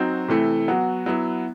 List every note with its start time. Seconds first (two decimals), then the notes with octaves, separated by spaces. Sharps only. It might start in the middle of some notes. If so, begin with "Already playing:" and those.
Already playing: F#3 C4 D#4 F#4
0.28 C3 E3 A3 E4
0.68 F#3 B3 F#4
1.06 F#3 B3 E4